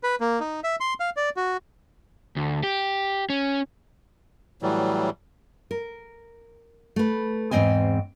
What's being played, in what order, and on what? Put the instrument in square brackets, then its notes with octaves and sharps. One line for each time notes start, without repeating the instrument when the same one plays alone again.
[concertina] B4
A#3
D#4
E5
C6
F5
D5
F#4
[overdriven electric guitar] D2
G4
C#4
[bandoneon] A2 E3 F#3 G3
[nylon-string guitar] A#4
A3 B4
E2 G#2 A#3 C4 D#5 G#5